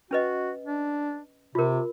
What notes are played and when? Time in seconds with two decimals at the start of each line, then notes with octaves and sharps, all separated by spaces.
0.11 C#4 F#4 B4 D#5
0.66 D4
1.55 C3 F4 A#4